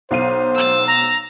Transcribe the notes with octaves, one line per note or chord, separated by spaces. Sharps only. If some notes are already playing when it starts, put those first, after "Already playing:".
B1 C5 F5 D#7
E6 A6
A#5